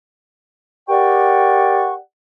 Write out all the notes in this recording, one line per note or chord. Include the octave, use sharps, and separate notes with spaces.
G4 A#4 D5 F#5 G5 C#6